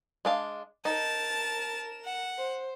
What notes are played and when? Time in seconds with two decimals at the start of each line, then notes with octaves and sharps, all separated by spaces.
0.25 G#3 D4 F5
0.85 D#4 A#4 A5 E7
2.05 F#5
2.37 C5